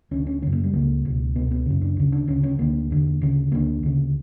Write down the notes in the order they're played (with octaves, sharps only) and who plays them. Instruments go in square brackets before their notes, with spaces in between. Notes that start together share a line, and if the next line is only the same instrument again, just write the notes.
[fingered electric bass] D2 D3 C#4
C#4
F#2 C#3 C#4
A#3
G3
C#2 C#3 A#3
C#2 B2
C#2 B2 B3
B3
F#2 C#3
D4
D2 C#3
D4
D2 C#3 C#4
C#4
D2 D3 A#3
E2 D3
D2 C#3
D2 D3 A#3
D2 C#3